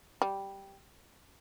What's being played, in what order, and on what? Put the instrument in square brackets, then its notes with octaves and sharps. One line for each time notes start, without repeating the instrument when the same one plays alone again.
[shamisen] G3